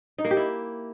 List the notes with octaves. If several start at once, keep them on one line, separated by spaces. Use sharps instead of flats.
D#4
A#3
G4
E4